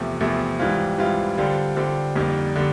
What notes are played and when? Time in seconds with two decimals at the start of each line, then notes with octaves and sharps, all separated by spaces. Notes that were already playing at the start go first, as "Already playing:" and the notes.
Already playing: E2 C3 F3 A3
0.20 E2 C3 F3 A3
0.59 G#2 E3 G3 C4 F4
0.99 G#2 E3 G3 C4 F4
1.37 D3 G3 C4 F4 A4
1.76 D3 G3 C4 F4 A4
2.15 F2 D3 G3 A#3 D#4
2.56 D3 G3